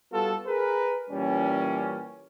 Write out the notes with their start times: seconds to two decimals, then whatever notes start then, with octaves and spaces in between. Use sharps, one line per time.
0.13 G3 B3 F4 F#4 A4
0.46 G#4 A#4 B4
1.10 A#2 E3 G3 C#4